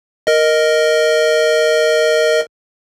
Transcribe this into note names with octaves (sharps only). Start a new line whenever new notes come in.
A#4 D#5